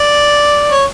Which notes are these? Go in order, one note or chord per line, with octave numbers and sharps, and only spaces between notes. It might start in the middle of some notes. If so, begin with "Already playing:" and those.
Already playing: D5
C#5